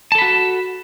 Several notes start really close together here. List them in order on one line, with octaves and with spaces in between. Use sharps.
A5 A4 B5 F#4